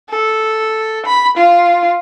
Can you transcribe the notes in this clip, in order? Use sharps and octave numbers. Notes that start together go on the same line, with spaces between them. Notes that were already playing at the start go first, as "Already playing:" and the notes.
A4
B5
F4